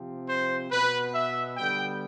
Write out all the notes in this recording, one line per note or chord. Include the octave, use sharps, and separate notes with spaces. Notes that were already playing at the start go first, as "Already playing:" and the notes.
Already playing: C3 F3 C4
C5
B2 B3 B4
E5
D3 G3 B3 G5